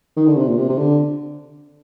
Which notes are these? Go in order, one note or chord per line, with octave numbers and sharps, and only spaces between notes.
D#3
D3
C3
A#2
C3
C3
D3